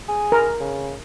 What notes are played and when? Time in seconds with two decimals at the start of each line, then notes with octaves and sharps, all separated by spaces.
0.09 G#4
0.32 A#4
0.60 C#3